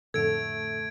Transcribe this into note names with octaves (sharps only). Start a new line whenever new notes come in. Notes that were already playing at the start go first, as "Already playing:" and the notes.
F2 A2 D3 A3 A4 G#6 D7